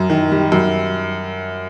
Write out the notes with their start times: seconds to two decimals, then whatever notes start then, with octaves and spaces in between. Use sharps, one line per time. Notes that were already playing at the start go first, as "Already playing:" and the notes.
Already playing: F#2
0.10 D#3
0.32 G3
0.52 F#2